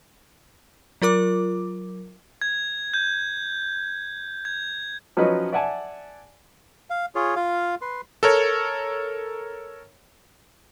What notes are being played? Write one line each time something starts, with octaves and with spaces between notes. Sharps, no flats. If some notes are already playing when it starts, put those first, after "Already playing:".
F#3 F4 A#4 D6
G#6
G6
G#6
F3 F#3 C#4 D#4 B4 D#5
D5 E5 F#5 G#5 A5
F5
F4 G#4 C#5
F4 F5
B4 C6
A4 A#4 C#5